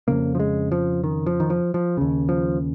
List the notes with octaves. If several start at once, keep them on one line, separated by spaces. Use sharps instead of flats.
F2 C#3 A#3
F3
G#3
F3
D#3
F3
D#3
F3
F3
D#2 C#3
F3